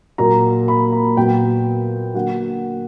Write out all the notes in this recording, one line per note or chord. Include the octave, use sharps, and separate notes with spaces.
A#2 F#3 A#3 A#5
B5
A#5
A#2 F#3 B3 G5
D3 F#3 A#3 F#5